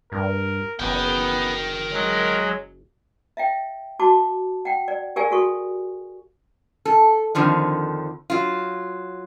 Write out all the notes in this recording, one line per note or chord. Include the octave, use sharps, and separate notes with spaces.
G2 A#4
F#1 B3 A#4 G5
F#3 G#3
E5 F5 G5
F#4 A5 D6
F#5 G5
D5
G4 G#4 A#4 D5 F5 G#5
F#4 A4 C#6
A4
F2 D3 D#3 F3
F#3 F4